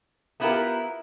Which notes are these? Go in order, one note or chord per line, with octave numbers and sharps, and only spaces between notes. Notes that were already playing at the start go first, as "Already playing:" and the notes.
A3 B3 E4 F4 G4 A#4